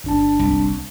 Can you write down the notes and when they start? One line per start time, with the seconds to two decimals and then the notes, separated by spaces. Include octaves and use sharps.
0.04 G1 D4 A5
0.39 C2